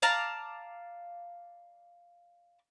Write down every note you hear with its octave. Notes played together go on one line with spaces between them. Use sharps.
D5 F5 A5 A#5